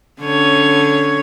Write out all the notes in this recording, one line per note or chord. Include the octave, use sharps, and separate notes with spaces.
D3 C#4 C#5